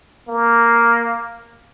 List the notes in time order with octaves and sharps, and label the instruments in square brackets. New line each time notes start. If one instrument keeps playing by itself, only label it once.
[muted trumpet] A#3